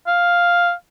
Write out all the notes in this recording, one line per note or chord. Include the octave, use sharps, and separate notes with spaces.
F5